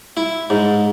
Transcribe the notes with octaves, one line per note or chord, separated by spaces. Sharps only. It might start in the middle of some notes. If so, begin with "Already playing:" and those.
E4
G#2